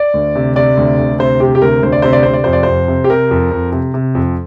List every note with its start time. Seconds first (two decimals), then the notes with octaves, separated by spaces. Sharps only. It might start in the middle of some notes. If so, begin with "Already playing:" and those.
Already playing: D5
0.14 D2
0.35 C3
0.55 C3 D5
0.77 D2
0.99 D2
1.19 C3 C5
1.40 C3 G4
1.55 G4
1.62 D2 A#4
1.82 D2 C5
1.92 D5
2.02 C3 C5
2.13 D5
2.23 C3 C5
2.34 D5
2.44 F2 C5
2.53 D5
2.63 F2 C5
2.88 C3
3.04 G4
3.10 C3 A#4
3.31 F2
3.51 F2
3.72 C3
3.94 C3
4.15 F2